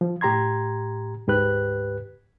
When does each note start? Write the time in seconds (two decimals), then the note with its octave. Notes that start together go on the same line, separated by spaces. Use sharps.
0.01 F3
0.21 A2 G4 A#5 C6 G#6
1.27 D2 G#2 G4 B4 F#6